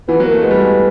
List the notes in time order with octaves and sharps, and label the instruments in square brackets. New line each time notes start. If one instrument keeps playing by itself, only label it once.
[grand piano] E3 [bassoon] B3
[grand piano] F#3
[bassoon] A#3
[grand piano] A3
[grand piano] G#3 [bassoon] B3
[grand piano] G3
G#3